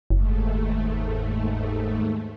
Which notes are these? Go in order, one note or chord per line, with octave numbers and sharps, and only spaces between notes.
F#1 D#2 G#2 A3